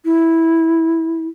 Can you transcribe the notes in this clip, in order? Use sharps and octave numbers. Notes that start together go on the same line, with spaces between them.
E4